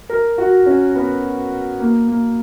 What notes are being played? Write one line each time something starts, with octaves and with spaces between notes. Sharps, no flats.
A#4
F#4
C#4
B3
A#3
A#3